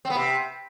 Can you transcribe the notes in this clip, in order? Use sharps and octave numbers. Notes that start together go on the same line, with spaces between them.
C4
B3
C3